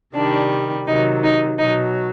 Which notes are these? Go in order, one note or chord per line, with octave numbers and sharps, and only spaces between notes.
C3 D#3 G3 D4
C3 D#3 F#3 D#4
D#4
B2 F#3 D#4